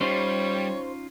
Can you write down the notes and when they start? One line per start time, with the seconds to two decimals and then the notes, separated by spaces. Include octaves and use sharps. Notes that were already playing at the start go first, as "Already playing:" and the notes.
0.01 G3 C#4 D#4 F4 C5 C#5